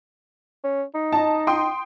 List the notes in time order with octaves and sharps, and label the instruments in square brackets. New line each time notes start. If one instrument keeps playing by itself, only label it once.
[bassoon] C#4
D#4
[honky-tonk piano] D#5 A5
G5 C6 D#6